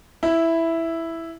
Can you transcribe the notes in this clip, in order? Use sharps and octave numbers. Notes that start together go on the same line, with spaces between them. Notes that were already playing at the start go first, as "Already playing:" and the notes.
E4